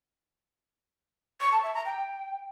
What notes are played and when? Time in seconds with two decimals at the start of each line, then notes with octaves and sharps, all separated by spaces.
1.41 C#6
1.52 A5
1.63 E5
1.74 A#5
1.85 G5